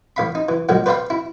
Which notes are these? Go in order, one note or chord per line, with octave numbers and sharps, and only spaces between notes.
A1 F5 B5
D#4
E3
A#2 D3 F3 F#3 G#3
B4 C5 D5 F5 G5 C6
E4